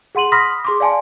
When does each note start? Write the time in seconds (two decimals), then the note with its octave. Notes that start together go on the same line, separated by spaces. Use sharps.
0.15 G#4 F#5 C6 D#7 F#7
0.32 B5 C6 D#6 F6 A#6 B6
0.65 G#4 C6 D6
0.80 D5 F5 G#5 A5 C6